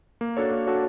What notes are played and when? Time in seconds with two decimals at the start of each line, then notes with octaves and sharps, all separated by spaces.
0.21 A#3
0.37 D4 F#4 A4 C#5
0.52 A#3
0.67 D4 F#4 A4 C#5